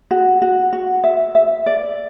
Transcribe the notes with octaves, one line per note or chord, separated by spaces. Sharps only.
F#4
F#4
F#4
E5
E5
D5